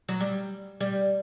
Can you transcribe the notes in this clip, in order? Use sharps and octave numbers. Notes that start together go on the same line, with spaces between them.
F#3
G3
G3